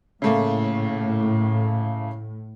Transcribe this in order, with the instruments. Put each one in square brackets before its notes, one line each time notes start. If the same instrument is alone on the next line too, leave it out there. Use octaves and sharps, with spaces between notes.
[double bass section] A2 [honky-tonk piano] C#3 A3 A#3